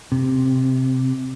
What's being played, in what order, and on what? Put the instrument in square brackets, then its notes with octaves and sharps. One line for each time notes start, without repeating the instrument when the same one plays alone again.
[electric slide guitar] C3